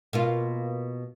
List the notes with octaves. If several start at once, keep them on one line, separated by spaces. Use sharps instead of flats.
B2 A#3 F4